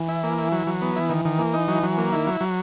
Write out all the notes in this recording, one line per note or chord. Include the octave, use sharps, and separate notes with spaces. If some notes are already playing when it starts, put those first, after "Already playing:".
Already playing: E3
E4
A#3
E4
F#3
F#3
B3
E3 E4
D#3
D#3
A#3
D#4
F#3
F#3
A#3
D#3 E4
F#3
F#3